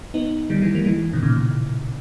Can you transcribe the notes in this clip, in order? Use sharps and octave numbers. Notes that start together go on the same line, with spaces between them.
B3 D#4
D#3 G3
E3 G#3
G3 A#3
E3 G#3
B2 D#3
A#2 C#3